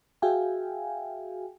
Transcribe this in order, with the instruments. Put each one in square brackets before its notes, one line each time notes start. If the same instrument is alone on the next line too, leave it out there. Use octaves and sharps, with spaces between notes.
[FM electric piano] F#4 G#4 E5 F5 G5 G#5